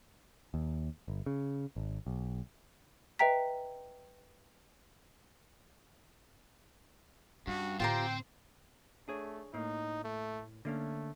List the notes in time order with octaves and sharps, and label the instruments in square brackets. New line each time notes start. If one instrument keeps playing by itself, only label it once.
[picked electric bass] D#2
G1
C#3
G#1
B1
[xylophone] B4 D#5 E5 G5 A#5 B6
[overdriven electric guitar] G2 [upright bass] C#4 [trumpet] F#4
[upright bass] A2 D3 [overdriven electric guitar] C4 C5 [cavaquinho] F4 G4 A#5 [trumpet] G5
[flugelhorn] A3 [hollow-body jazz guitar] D4 G#4 C#5
[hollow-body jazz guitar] A2 A#3 [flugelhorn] D#4
[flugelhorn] A3
[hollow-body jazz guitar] D3 A#3 C#4 [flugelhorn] A3